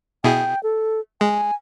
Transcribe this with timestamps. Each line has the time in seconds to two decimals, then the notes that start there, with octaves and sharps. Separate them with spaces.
0.24 B2 E4 G#4 G5
0.63 A4
1.21 G#3 G#5